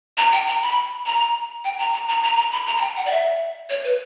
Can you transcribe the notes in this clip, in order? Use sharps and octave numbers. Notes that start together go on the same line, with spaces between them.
A#5
G5
A#5
B5
A#5
G5
A#5
A#5
A#5
A#5
A#5
B5
A#5
A#5
G5
F#5
D5
E5
C#5
B4